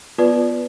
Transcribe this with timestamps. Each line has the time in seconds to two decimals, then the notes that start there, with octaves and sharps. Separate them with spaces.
0.18 B3 F4 B4 D5